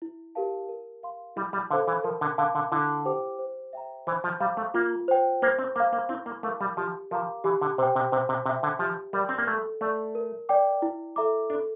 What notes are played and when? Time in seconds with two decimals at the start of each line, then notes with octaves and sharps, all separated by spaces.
0.02 E4
0.35 G4 A#4 F5 A5
0.69 A#4
1.03 F5 C6
1.36 G3 E4
1.53 G3
1.71 D3 A4 C5 F5 C6
1.87 E3
2.04 F3 A#4
2.21 D3
2.38 D3 F5 A5 D6
2.55 D3
2.72 D3 E4
3.05 G4 C5 G5 D6
3.39 C5
3.73 E5 G5 A#5
4.07 E3 C5
4.24 F3
4.40 G3 F5 A#5 D6
4.57 A3
4.74 A#3 F4
5.08 C5 G5
5.42 A#3 C5
5.59 C4
5.75 A#3 F5 A#5 D6
5.93 A#3
6.09 C4 E4
6.26 A#3
6.43 A3 A#4 F5 A5 D6
6.61 G3
6.77 F3 G4
7.11 F3 A#4 F5 A#5 D6
7.44 E3 G4
7.61 D3
7.78 C3 C5
7.83 G5
7.96 C3
8.12 C3 C5
8.29 C3
8.46 C3 E5 G5
8.63 D3
8.79 F3 G4
9.13 G3 A#4 D5 G5
9.29 C4
9.38 A#3
9.47 A3 A4
9.81 A3 D5 A5
10.15 A#4
10.49 D5 G5 D6
10.82 E4
11.16 A4 E5 A#5 D6
11.50 D4 A4